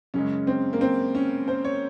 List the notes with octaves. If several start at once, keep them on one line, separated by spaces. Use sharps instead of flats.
F#2 C#3 G#3 C#4
C4
A#3
C4
C#4
C5
C#5